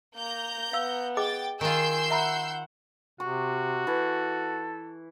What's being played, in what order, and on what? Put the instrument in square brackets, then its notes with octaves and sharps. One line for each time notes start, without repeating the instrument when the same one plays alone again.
[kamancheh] A#3 [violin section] A#5 G6
[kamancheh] B3 [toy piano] F5 E6
[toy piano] G#4 D#5 D6 [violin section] G5 A6
[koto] D#3 F4 [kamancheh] G#5 [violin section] E6 G6 C7
[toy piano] E5 A#5 B5 [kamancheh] F#5
[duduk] C3 [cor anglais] F#4 [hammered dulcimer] C#6
[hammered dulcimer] E3 [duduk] A4